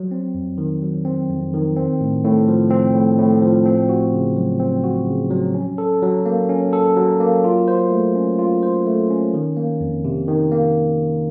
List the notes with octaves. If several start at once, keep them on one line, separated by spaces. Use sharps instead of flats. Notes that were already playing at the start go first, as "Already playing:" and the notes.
Already playing: F#3
C4
F2
D#3
F#3
C4
F2
D#3
C4
A2
A2
F3
C4
A2
A2
F3
C4
F#4
C#3
F#3
C4
F#4
C#3
F#3
C#4
A4
F#3
A#3
C#4
A4
F#3
A#3
F4
C5
A3
C#4
F4
C5
A3
C#4
D#3
A#3
F2
C3
D#3
A#3